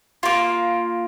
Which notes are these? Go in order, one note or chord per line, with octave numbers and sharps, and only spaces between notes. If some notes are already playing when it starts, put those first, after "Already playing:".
A#3 F4